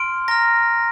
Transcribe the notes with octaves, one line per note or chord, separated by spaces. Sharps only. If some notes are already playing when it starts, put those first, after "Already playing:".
Already playing: C6 F6 D7
A#5 F6 A#6